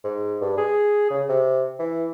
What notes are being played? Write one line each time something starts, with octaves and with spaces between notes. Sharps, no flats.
G#2
G2
G#4
C#3
C3
E3